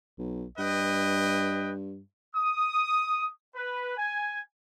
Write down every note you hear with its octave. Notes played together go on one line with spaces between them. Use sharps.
B1
G2 B4 D#5 G5
D#6
B4
G#5